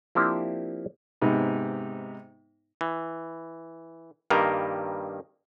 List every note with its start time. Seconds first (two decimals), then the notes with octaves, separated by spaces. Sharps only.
0.15 F3 A#3 C4 D4 E4 G4
1.21 G#2 C3 B3 D#4
2.81 E3
4.30 G2 D#3 G3 A#3 A#4